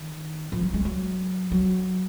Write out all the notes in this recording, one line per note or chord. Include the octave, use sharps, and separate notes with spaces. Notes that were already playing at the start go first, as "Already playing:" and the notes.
Already playing: D#3
F3
F#3
G#3
F#3
F#3